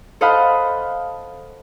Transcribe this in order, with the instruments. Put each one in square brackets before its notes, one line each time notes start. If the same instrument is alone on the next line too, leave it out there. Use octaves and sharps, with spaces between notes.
[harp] A4 C5 D#5 F5 F#5 B5